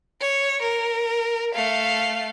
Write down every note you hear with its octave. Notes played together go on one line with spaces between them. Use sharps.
C#5
A#4
A3 F5